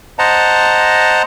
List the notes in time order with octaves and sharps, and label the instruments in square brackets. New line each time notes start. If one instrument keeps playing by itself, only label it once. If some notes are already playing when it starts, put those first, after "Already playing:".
[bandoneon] C5 D#5 F#5 A5 A#5